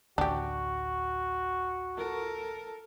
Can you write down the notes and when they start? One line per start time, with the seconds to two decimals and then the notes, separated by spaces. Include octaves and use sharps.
0.18 A1 D2 D4 F#4 G4
1.96 A4 A#4